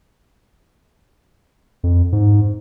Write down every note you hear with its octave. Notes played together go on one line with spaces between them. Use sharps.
F2
G#2